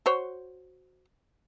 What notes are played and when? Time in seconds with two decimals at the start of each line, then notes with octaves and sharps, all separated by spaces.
0.06 F#4 C5 C#5